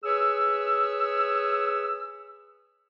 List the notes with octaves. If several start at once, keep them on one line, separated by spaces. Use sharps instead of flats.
G#4 B4 C#5 E6